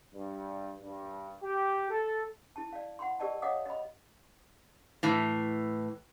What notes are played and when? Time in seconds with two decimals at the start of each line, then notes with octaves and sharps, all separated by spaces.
0.14 G2
0.81 G2
1.42 G4
1.91 A4
2.56 E4 A5
2.73 D5 F5
2.99 F#5 B5 C6
3.20 G4 A#4 D5 D#5 A5
3.42 C#5 D#5 F5 F#5 D6 D#6
3.66 D#5 B5
5.03 A2 E3